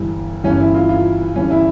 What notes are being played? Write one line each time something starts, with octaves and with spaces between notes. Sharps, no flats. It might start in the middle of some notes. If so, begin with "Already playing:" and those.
Already playing: G1 G2 E3
G1 G2 E3 C#4
E4
F4
F4
G1 G2 E3 C#4
E4